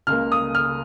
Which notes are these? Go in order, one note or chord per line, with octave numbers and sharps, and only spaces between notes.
C#2 C#3 A#3 F6
D#6
F6